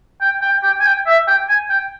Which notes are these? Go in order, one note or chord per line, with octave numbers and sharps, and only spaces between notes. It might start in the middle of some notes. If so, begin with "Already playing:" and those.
G5
G5
G5
G#5
G5
E5
G5
G#5
G5